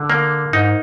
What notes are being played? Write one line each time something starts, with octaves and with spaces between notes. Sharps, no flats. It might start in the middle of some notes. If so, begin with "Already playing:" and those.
Already playing: D3
A#3
G#2 D#4